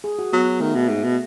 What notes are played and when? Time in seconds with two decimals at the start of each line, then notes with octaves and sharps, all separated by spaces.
0.04 G#4
0.19 F#4
0.33 F#3 B3
0.60 D#3 A3
0.75 B2
0.89 G#2
1.04 B2